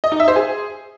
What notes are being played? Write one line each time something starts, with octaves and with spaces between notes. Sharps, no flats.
D#5
D#4
E5
C5
G#4